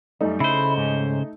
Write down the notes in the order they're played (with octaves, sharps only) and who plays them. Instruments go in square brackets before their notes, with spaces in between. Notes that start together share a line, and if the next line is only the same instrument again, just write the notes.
[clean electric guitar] F#2 G3 [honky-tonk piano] A3 D#4
[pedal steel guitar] C#3 C5 [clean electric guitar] E4
[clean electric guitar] G#2 C#4